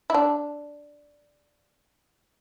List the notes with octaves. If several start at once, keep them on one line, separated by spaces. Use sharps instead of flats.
E4
D4